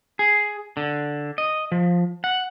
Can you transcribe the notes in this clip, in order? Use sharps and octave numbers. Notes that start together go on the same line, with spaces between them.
G#4
D3
D#5
F3
F#5